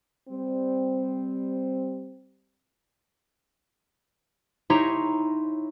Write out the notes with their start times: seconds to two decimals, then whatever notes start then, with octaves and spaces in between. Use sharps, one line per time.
0.29 G3 C4
4.70 D#4 E4 G4 C#5 A#5 C6